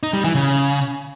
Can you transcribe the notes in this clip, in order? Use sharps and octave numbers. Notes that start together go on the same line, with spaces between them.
D#4
G3
E3
C#3